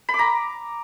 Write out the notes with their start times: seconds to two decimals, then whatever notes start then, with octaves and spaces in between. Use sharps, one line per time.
0.09 B5
0.14 D6
0.19 A#5